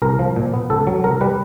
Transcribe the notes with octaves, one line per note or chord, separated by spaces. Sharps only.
C2 A#4
F3
A#2
B3
C#2 A4
F#3
C2 A#4
G3 B4